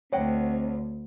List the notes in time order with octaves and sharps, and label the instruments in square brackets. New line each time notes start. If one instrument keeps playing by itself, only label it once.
[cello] D2 [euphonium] C4 [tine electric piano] C#5 [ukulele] D#5 F#5 G5